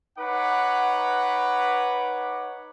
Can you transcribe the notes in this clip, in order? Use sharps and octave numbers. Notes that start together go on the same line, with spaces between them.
D#4 B4 C#5 F#5 D6